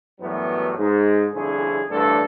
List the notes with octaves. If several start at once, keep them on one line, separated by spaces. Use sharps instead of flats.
F#2 A2 E3 F#3 G3 B3
G#2
C2 F2 D3 C#4 E4 G#4
A1 D2 G2 D4 A4